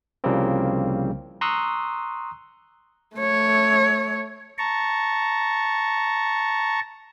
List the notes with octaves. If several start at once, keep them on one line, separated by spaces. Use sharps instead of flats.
C2 C#3 F3 G3 A#3 C4
A#5 C6 C#6 D#6 E6 F#6
A3 C#5
A5 A#5 C#6